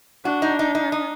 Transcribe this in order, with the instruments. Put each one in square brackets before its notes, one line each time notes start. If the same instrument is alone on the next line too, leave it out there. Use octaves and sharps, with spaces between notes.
[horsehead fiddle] D4 [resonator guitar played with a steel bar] F#4
[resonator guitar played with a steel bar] D#4
D#4
D#4
D#4